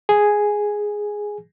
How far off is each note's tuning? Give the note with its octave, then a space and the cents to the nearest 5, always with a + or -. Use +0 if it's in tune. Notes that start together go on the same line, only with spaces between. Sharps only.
G#4 +0 G#5 +0